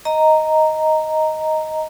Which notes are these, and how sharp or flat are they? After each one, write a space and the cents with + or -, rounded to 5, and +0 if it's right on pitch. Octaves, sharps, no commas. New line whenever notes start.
D#5 +10 A#5 -5